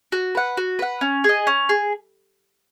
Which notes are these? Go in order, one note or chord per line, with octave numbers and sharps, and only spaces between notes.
F#4
B4 F#5
F#4
B4 F#5
C#4
G#4 D#5
C#4
G#4